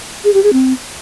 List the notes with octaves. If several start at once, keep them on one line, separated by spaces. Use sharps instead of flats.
G#4
G4
G#4
C4